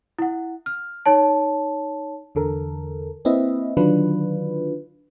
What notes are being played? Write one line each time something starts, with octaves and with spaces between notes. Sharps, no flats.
E4 F#5
F6
D#4 C#5 A5
E2 D3 A4 A#4
A#3 C4 E4 B4 D#5 E5
D3 D#3 F#3 D4 F4 B4